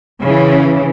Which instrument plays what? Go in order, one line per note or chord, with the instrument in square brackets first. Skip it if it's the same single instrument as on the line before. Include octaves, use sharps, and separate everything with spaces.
[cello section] C#3 E3